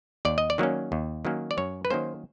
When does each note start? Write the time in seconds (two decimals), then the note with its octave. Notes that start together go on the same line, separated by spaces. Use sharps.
0.25 D#2 D5
0.38 D#5
0.50 D5
0.58 D#3 F#3 A#3 C#4
0.92 D#2
1.25 D#3 F#3 A#3 C#4
1.51 D5
1.57 F#2 C#5
1.85 B4
1.90 D#3 F#3 A#3 C#4 C5